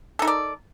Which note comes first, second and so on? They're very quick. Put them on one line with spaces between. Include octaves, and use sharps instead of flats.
A4 D#4 A#4 D5